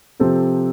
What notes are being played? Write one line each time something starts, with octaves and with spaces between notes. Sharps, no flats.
C3 F3 C4 A4 C5